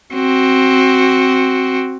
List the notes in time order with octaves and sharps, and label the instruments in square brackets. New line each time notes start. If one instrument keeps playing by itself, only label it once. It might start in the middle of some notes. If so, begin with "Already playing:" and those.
[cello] C4 F#4